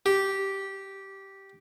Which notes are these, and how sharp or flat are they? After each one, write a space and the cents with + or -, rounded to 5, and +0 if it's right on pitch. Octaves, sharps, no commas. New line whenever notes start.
G4 -10